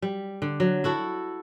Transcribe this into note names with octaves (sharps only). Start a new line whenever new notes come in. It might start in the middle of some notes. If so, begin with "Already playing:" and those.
G3
D3
F#3
E4 F#4 A4